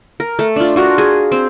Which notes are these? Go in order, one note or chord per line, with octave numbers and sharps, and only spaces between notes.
A#4
A3
D4 F4
F4 F#4 A#4
G#4
C4